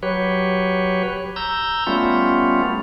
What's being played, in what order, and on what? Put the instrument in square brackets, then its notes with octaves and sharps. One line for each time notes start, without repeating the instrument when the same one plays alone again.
[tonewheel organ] F#3 G4 B4 C#5
A#5 E6 G6
G3 A3 B3 C#4 F4